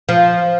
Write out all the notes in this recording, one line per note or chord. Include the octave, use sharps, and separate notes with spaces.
F3